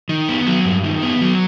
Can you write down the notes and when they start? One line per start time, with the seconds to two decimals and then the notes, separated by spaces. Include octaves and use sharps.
0.09 D#3
0.29 B3
0.47 F#3
0.65 G2
0.84 D#3
1.02 B3
1.21 F#3